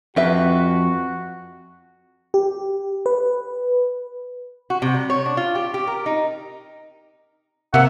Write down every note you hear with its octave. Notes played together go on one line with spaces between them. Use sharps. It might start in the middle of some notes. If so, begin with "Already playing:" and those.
F2 F#4 G4 B4 E5
G4
B4
F#4
C3
G3
C#5
D4
F4
G4
G4
A#4
D#4
C3 A#3 E5 F#5